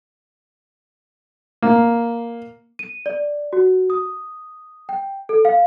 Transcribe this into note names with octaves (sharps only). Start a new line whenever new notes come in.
A#3
D#7
D5
F#4
D#6
G5
A4
F5